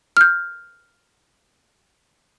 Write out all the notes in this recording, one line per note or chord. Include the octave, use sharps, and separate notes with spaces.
F6 G6